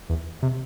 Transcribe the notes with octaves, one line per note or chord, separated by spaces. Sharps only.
E2
C3